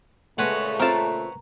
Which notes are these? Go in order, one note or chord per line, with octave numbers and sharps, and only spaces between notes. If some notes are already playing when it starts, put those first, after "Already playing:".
A#2 C#3 G#3 A3 F#4 B4 C#5
C4 F4 A#4 A5